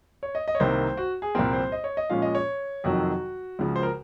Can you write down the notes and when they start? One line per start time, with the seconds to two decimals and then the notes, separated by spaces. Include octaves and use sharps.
0.23 C#5
0.35 D#5
0.48 D#5
0.55 C#5
0.60 C2 C3 D#3 A#3 C5
0.97 F#4
1.22 G#4
1.35 C2 A#2 F3 C4 A#4
1.53 C5
1.72 D#5
1.84 C#5
1.97 D#5
2.10 A#2 F3 G#3 C#4 F5
2.22 D#5
2.35 C#5
2.84 F2 C3 D#3 F#3 F#4
3.59 C#2 C#3 F3
3.76 C5
3.83 A#4